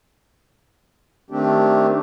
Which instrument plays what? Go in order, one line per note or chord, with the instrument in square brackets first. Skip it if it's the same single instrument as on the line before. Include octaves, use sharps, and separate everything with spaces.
[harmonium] D#3 A3 C4 D4 G4